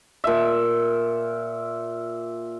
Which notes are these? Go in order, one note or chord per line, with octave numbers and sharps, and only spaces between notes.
A#2 E5